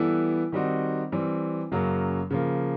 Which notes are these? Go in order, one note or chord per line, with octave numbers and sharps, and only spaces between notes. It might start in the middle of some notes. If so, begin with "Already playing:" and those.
Already playing: E3 G3 B3 E4 A4
D#3 G3 C4 D#4 F#4
E3 G3 C4
F#2 C#3 F#3 A#3
C#3 F3 A#3